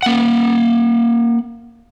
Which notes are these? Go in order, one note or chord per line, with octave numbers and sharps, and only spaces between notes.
A#3 F#5